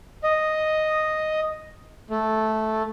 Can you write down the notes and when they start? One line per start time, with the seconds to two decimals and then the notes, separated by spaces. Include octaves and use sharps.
0.23 D#5
2.10 A3